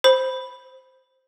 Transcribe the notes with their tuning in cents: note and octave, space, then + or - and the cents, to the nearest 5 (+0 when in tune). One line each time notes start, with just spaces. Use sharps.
C5 +0 B5 +0